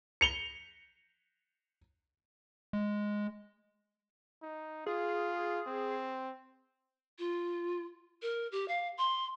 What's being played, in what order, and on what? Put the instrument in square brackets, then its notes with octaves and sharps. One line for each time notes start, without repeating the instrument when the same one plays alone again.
[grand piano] C#7 F7 G7
[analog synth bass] G#3
[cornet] D#4
[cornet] F4 [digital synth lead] G#4
[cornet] C4
[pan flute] F4
A#4
G4
F5
C6